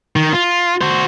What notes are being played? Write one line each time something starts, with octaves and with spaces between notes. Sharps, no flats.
D#3
F4
F#4 C5